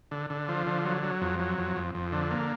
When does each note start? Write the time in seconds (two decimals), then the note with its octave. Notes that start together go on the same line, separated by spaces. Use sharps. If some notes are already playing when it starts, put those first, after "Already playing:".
0.11 D3
0.30 D3
0.48 F3
0.67 D3
0.85 F#3
1.03 F#3
1.21 F2
1.39 F#3
1.58 F2
1.76 F2
1.95 F2
2.12 D3
2.31 A#3